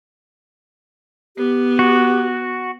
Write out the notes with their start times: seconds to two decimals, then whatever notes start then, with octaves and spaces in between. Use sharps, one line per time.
1.37 B3 G4
1.79 F#4